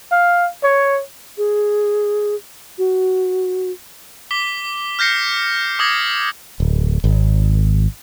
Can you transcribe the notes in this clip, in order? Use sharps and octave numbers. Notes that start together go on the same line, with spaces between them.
F5
C#5
G#4
F#4
D6 B6 G7
F6 G6 A#6 C7 C#7
D6 D#6 G#6 A#6
D1
G#1